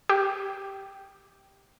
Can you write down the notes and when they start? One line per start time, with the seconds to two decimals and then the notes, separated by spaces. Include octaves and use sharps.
0.09 G4